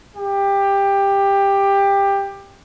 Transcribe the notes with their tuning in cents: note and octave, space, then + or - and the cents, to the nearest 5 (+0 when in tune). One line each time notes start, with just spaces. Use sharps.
G4 +15